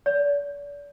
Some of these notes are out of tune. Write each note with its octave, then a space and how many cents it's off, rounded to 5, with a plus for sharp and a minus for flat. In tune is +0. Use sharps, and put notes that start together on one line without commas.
D5 -35